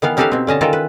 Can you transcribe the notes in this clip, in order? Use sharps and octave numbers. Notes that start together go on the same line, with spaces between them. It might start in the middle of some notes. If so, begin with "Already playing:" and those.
D#3 E3 B3 F5
C#4 D#4 G4 A4 B4 F5
B2 C4
D3 C#4 D#5 A5
D#3 E3 F4 A4 A#4
B4